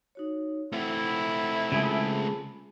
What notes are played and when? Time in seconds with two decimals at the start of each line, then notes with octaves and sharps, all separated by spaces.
0.15 D#4 F#4 C#5
0.72 A3 C4 E4 F#5
1.72 C#3 G#3 F4 G#4 A5 B5